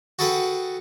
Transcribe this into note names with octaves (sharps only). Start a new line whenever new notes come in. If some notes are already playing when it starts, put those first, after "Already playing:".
F#4 G#4 A4 B4 F#5 G5